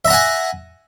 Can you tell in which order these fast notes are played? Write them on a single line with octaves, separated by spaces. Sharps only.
E5 A#5 F#5 G#5